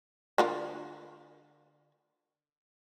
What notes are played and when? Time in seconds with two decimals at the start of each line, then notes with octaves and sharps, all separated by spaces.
0.38 D3 F4 A#4